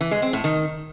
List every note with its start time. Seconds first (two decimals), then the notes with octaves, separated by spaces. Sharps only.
0.01 E3
0.11 G#3
0.22 C4
0.33 A2
0.44 D#3